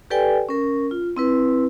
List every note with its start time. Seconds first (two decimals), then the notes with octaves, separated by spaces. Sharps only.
0.10 G4 A4 B4 D5 G5 G#5
0.49 C#4 A#4
0.91 F4
1.17 C4 E4 B4